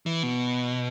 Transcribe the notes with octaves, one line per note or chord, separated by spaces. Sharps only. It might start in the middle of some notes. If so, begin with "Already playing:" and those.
E3
B2